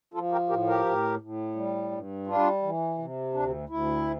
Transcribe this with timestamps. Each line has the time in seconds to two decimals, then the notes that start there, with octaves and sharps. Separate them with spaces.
0.14 F3 F4 A4
0.32 G4 A#4
0.49 A2 G4 A#4
0.67 G4 A#4
0.86 A2
1.21 A2
1.56 G3
1.91 G2
2.27 G3 D4 F4
2.62 E3
2.98 C3
3.34 D2 D4
3.69 D2 E4